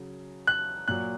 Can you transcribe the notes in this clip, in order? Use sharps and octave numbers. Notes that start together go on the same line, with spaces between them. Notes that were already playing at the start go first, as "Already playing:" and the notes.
Already playing: C#3 F#3
F#6
A#2 F#3 F#6